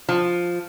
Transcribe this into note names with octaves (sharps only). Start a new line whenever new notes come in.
F3